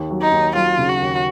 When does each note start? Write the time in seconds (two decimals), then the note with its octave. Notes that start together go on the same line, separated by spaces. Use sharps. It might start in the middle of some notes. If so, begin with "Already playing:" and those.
Already playing: D#2
0.11 F#3
0.22 D#4
0.32 D#2
0.56 F#3 F4
0.78 C#3
0.89 F#4
1.00 D#2